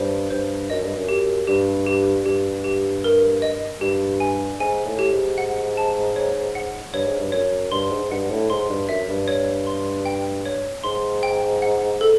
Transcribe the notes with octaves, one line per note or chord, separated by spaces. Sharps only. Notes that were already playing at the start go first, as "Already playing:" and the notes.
Already playing: G2 C5
G2 C5
F#2 D#5
G2
F#2
G4
G2 G4
G4
G2 G4
G4
A#4
D#5
G2 G4
G#5
G#2 G#5
A2
G4
G#2
F#5
A5
C#5
F#5
G2 C#5
G#2
G2
F#2 C#5
G2 C6
G#2
G2 F#5
A2
G#2 C6
G2
F#2 E5
G2
C#5
C6
G5
C#5
G#2 C6
G5
F#5
A4